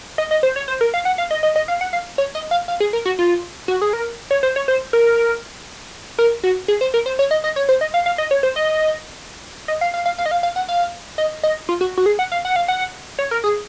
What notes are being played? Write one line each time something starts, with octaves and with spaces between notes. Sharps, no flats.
D#5
D#5
C5
C#5
C5
A#4
F5
F#5
F5
D#5
D#5
D#5
F5
F#5
F5
C#5
D#5
F5
F5
G#4
A#4
F#4
F4
F#4
G#4
A#4
C#5
C5
C#5
C5
A#4
A#4
F#4
G#4
C5
A#4
C5
C#5
D#5
D#5
C#5
C5
D#5
F5
F5
D#5
C#5
C5
D#5
D#5
F5
F5
F5
F5
D#5
F5
F5
F#5
F5
D#5
D#5
F4
F#4
F#4
G#4
F#5
F5
F#5
F5
F#5
C#5
A#4
G#4